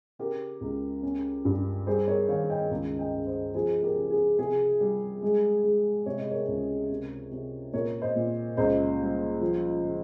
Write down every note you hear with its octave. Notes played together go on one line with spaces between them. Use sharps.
C#3 G4 A#4
C#2
C#4
G2
G3 G#4 C5
A#4 C#5
D#3 C#5 F5
D#5 G5
C#2
D#5 G5
C#3
C5 D#5
F3 G#4 C5
G4 A#4
C#3
G#4
C3 G#4
G3
G#3
G#3
C3 C#5
D#5
A#4 C#5
C#2
C3
C3
A#2 A#4 C#5
C5 D#5
A#2
C#2 C5 D#5
G3
F3
C#3